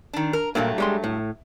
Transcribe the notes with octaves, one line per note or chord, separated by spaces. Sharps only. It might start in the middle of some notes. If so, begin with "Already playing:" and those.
D#3 D4
A#4
G2 A#2 F#3 A3 A#3
G3 G#3 C6
A2